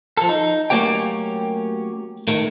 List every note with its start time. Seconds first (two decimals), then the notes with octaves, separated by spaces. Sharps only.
0.17 F3 A4
0.29 D#4
0.70 F#3 A3 A#3 C#4 G4 G5
2.28 A2 D#3 A3